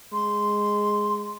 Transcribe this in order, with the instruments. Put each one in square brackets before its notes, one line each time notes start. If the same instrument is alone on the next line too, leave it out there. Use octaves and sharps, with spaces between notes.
[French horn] G#3 [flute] C6